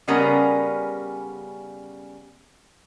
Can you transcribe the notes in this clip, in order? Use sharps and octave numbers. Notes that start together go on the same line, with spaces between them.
C#3 G3 B3 C#4 A#4